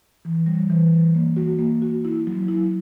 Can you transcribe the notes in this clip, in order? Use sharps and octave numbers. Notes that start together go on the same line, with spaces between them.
E3
G3
E3
E3
A#3
F#4
A#3
F#4
E4
F#3
E4